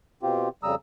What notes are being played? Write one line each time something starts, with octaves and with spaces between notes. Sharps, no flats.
B2 C4 F4 G4
F2 C#3 G3 A#5 D#6 E6